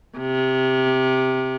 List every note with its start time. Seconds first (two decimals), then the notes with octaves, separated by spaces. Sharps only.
0.18 C3